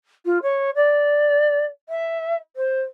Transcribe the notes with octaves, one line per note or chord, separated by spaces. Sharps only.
F4
C#5
D5
E5
C5